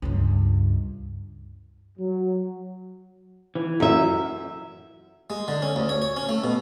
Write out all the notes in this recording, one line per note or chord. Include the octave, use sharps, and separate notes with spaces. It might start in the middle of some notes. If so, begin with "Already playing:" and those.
C#2 G2
F#3
E3
F#2 E5
G#3
D3
C#4
D2
C#5
C#5
C#4
A3
B2